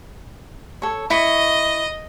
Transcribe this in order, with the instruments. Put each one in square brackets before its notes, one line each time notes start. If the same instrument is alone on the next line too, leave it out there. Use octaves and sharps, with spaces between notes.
[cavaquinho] A4 C#5
[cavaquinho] E4 C#6 [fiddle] D#5